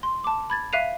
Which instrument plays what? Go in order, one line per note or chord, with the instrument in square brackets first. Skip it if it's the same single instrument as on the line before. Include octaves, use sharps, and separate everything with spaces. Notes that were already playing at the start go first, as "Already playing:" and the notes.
[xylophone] C6
A5 D6
B5 G#6 A6
E5 F5 F#6 C7 D#7 F7